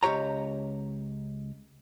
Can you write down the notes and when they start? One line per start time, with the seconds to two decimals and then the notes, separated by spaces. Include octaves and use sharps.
0.03 C#2 B2 G4 C#5 A#5